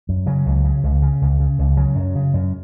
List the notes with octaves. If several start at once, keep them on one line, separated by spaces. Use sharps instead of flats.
F#2
C#3 F#3
C#2
C#3
C#2
C#3
C#2
C#3
C#2
C#3 F#3
F#2
C#3
F#2